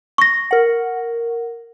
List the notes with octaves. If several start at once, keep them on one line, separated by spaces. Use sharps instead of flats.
C#6 A#6
A#4 F#5